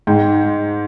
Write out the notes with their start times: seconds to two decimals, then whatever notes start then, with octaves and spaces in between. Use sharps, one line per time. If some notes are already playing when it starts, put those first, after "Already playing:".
0.07 G#2 G5